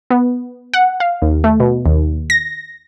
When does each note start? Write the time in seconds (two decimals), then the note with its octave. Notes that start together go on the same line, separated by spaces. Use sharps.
0.10 B3
0.74 F#5
1.00 F5
1.22 D#2
1.44 A3
1.60 B2
1.86 D#2
2.30 A#6